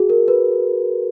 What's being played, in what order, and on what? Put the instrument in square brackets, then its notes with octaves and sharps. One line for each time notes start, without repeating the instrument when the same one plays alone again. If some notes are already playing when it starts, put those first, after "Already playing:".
Already playing: [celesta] F#4 G#4
A#4
B4